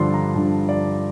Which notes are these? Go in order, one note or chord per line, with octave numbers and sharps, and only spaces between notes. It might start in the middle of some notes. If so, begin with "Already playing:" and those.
Already playing: G2 D3 F3 D5 C6
A#5
G2 D3 F3 A5
D5